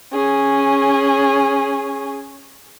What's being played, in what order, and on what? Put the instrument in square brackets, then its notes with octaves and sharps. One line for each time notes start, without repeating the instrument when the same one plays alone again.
[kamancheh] C#4 G#4